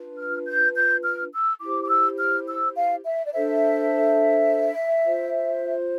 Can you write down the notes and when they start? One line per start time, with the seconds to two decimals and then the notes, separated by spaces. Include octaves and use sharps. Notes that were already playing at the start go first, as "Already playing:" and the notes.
Already playing: D4 F4 B4
0.18 F6
0.47 G6
0.76 G6
1.04 F6
1.33 E6
1.61 E4 G4 C5 D6
1.85 D6
1.89 E6
2.18 F6
2.47 E6
2.76 F5
3.05 E5
3.26 D5
3.32 D4 A4 C5 E5
5.04 F4 C5